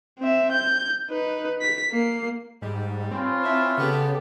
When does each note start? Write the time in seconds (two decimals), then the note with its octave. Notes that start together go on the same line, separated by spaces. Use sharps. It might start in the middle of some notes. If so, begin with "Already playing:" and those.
0.19 C4 E5
0.52 G6
1.10 D#4 B4
1.61 B6
1.92 A#3 C7
2.62 G#2 G3
3.11 C4 C#4 F4 B4
3.43 E4 E5 A5
3.78 C#3 B3 G4 A4